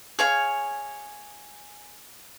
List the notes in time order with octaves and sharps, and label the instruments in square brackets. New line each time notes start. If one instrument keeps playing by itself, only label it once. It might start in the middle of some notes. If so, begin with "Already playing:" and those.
[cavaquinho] G#4 C#5 F5 G#5